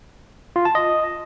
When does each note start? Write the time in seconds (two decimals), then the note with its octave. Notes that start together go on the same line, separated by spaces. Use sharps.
0.56 F4
0.65 A5
0.75 D#5